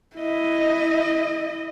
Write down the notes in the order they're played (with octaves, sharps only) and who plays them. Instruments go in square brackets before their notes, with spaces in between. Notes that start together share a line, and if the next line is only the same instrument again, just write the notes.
[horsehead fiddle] E4 D#5